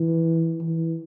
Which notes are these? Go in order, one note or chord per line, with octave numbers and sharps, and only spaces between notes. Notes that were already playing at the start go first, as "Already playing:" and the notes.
Already playing: E3
E3